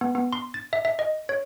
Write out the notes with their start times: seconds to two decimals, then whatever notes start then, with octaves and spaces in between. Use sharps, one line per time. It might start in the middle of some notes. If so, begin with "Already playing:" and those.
0.01 B3
0.15 B3
0.33 C6
0.54 A6
0.73 E5
0.85 E5
0.99 D#5
1.29 C#5